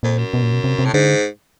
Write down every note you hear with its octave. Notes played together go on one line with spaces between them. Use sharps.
F2 A#2
F#2
B2
A#2
B2
C3
C3
A2
G#2 D3